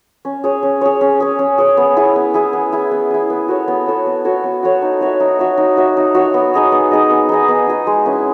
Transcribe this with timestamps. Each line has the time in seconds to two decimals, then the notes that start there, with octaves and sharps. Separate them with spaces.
0.25 C#4
0.44 G#4 C#5
0.63 C#4
0.81 G#4 C#5
1.01 C#4
1.20 G#4 C#5
1.39 C#4
1.58 G#4 C#5
1.77 B3
1.97 E4 G#4
2.16 B3
2.34 E4 G#4
2.53 B3
2.72 E4 G#4
2.91 B3
3.11 E4 G#4
3.30 B3
3.48 F#4 A4 C#5
3.68 B3
3.86 F#4 A4 C#5
4.06 B3
4.25 F#4 A4 C#5
4.44 B3
4.63 F#4 A4 C#5
4.82 D#4
5.01 F#4 C#5 E5
5.20 D#4
5.39 F#4 C#5 E5
5.58 D#4
5.77 F#4 C#5 E5
5.97 D#4
6.15 F#4 C#5 E5
6.34 B3
6.54 D#4 G#4 D#5
6.72 B3
6.91 D#4 G#4 D#5
7.10 B3
7.29 D#4 G#4 D#5
7.48 B3
7.67 D#4 G#4 D#5
7.87 G#3
8.05 C#4 E4 B4